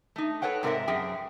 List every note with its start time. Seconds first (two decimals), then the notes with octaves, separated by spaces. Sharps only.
0.16 A3 D#4
0.42 A4 B4 C#5 F#5 G5
0.63 G#2 C3 C4 A#4 D#5 E5
0.87 F#2 G#4 E5 G5